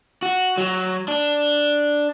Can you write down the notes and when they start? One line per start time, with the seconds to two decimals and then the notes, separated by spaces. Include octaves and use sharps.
0.22 F#4
0.58 F#3
1.08 D4